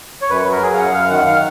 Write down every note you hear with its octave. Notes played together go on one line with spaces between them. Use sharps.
C#5
F#2 B4
B4
F#3
A#4
F#3 G#4
F5
F#2 F#5
F#2 F5
D#3 F#5
D#3 F5